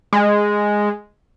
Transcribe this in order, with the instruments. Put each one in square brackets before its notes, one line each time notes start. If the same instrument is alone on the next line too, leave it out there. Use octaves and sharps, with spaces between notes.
[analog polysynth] G#3